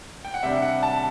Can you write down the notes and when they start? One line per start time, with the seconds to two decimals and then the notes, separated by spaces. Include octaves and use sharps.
0.25 G5
0.34 F#5
0.43 C3 G3 D4 E5
0.62 F#5
0.83 A5